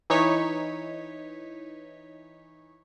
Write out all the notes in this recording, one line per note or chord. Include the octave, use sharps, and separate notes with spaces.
E3 D#4 C#5 B6